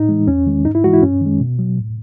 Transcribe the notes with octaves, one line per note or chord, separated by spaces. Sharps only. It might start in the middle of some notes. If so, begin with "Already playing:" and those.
Already playing: A2 D#4
E3 G#3
E2 C#4
D#3 G#3
G#2 D#4
E4
E3 G#3 F#4
E4
F#2 C#4
D#3 G#3
B2
F#3
A2